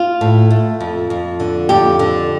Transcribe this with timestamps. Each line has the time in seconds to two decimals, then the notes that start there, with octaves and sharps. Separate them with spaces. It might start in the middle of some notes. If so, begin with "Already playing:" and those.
Already playing: F4
0.21 A2
0.50 A3
0.80 F2
1.10 F2
1.40 D3
1.69 F2 G4
1.99 D3